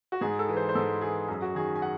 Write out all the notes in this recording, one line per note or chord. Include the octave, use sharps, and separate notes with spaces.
F#4
G#2 G#4
A4
E3
C5
C5
G#2 A4
E3 G#4
F#2 G#4
F#4
D#3 G#4
G#5
F#5